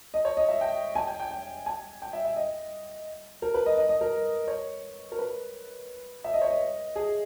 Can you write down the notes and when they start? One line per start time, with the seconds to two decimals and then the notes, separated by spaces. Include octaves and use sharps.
0.14 D#5
0.25 C#5
0.37 D#5
0.48 E5
0.61 G5
0.95 G#5
1.07 G5
1.20 G5
1.31 G5
1.66 G#5
2.02 G5
2.13 E5
2.25 E5
2.36 D#5
3.42 A#4
3.54 B4
3.66 D#5
3.78 D#5
3.89 D#5
4.01 A#4
4.48 C#5
5.12 A#4
5.19 B4
6.24 E5
6.34 D#5
6.42 C#5
6.50 D#5
6.96 G#4